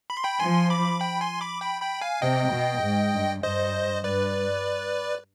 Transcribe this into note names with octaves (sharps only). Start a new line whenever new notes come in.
B5
C6
G5 B5
F3 G#5 C6
B5 D6
G5 B5
G#5 C6
B5 D6
G5 B5
G5 B5
F5 G#5
C3 D#5 G5
B2
G#2
G2
G2 C5 D#5
G2 B4 D5